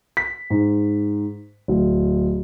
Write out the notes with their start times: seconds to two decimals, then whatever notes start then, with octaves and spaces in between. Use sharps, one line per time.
0.17 B6
0.50 G#2
1.68 D1